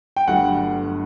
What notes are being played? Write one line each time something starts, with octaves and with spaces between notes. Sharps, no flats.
G5
G1 G2 F#3 A3 F#5